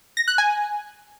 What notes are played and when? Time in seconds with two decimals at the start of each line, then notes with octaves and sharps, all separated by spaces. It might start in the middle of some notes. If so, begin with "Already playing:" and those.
0.17 A#6
0.28 F#6
0.38 G#5